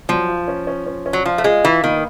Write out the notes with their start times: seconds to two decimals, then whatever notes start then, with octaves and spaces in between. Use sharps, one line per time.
0.09 F3 F#3
0.29 F4
0.48 C#4
0.67 C#4
0.86 C#4
1.06 C#4
1.13 F#3
1.25 F3 F4
1.38 A3
1.44 G#3 F4
1.64 E3 F4
1.84 D#3 A#3